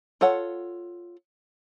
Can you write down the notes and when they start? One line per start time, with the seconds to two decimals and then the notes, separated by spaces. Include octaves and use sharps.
0.21 F4 A4 C#5 F#5